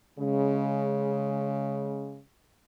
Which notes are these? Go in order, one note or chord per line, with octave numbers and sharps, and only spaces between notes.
C#3 G#3